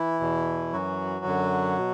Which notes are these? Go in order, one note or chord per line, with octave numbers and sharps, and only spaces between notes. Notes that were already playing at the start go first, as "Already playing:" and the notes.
Already playing: E3 E4
E2 B2
F#2 E3 F#3 F#4
F#2 D3
B2